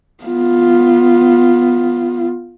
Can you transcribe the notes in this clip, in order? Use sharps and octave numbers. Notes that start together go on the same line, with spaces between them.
B3 F4